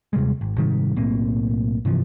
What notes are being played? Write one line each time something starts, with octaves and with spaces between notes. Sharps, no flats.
D#2 C3 G3 G#3
G#1
G#2 C3 D#3 G3
B1 A2 A#3 C4
G2 C3 E3 F3